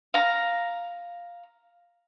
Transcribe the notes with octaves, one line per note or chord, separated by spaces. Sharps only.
F5 A#5